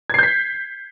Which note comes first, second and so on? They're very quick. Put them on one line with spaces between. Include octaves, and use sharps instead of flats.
G#6 C7 G6 B6